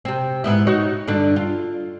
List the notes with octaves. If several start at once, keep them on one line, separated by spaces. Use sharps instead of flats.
C3 C4
G#2 B3 E4
D#4 F#4 C#5
G2 D3 D4
F4